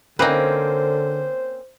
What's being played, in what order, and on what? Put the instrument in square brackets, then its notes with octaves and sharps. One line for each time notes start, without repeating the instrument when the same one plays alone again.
[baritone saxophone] D3 [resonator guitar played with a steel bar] A#3 C4 C#4 [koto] D#4 B4 [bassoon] C5